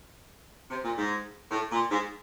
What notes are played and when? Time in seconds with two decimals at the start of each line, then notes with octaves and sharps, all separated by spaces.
0.70 C3
0.84 A#2
0.97 G#2
1.51 A2
1.71 A#2
1.91 G#2